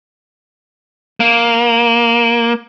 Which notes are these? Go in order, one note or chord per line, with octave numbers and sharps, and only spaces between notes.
A#3